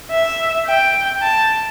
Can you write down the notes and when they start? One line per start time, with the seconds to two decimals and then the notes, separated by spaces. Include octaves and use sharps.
0.11 E5
0.67 G5
1.22 A5